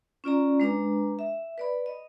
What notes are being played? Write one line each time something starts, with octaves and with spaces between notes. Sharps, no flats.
C#4 F4 D5 A#5
G#3 D4 B4 A#5
E5
B4 D5 B5
D#5